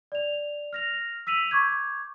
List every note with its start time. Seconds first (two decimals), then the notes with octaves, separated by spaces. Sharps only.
0.12 D5 F7
0.73 F6 A#6 F7
1.27 E6 B6 D#7 F7 F#7
1.51 C#6 D6 G6 G#6